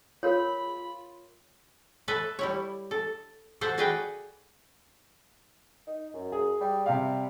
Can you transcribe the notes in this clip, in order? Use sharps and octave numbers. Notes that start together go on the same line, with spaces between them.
F4 A#4 C#5 B5
A4 B4 E5
G3 E4 C#5
A4
A4 C5 E5 F#5
F#4 G#4 B4 D5 G5
D#4
F#2
G#4
G3
C3 G3 F5